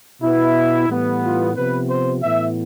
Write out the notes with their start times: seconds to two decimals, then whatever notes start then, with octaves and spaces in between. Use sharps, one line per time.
0.21 B2 B3 E4
0.87 A2 E3 G3 B3
1.22 F4
1.55 C3 F3 B3 B4
1.89 C5
2.22 A2 E3 B3 E5